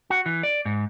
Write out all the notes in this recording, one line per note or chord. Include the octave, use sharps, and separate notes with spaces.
F#4
E3
D5
G#2